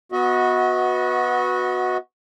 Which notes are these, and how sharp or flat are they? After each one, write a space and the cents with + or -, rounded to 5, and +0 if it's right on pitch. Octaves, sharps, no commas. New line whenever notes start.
B3 +0 F#4 -10 D#5 +40